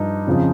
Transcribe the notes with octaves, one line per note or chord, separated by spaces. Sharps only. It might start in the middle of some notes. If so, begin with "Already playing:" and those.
Already playing: G2 F3 D#4
F2 C#3 F3